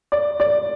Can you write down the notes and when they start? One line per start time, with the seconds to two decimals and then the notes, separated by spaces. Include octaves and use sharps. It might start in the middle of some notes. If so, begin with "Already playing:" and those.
0.12 D5
0.40 D5